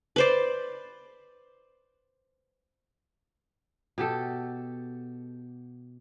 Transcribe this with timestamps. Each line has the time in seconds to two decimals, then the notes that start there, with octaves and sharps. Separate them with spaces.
0.16 B4 C5 D5
3.98 B2 G4 A4